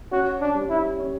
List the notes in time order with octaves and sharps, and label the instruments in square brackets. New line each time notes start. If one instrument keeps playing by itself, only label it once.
[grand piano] C#4 [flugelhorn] F#4
[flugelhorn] D4
[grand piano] G3
[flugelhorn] E4
[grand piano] C#4